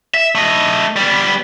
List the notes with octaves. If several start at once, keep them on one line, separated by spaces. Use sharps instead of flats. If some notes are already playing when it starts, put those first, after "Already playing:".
E5
A3 D#5
G3 B3